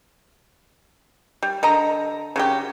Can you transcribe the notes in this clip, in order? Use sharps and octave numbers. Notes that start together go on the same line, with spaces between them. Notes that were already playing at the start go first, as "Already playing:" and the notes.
G3
D3 D#5 A#5
C#3 F#3 G4